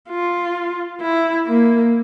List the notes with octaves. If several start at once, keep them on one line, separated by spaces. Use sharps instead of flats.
F4
E4
A#3